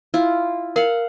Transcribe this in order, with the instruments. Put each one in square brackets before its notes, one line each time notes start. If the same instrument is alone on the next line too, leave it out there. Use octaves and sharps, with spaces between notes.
[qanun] E4 F4
[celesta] A#4 [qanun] F5 F#5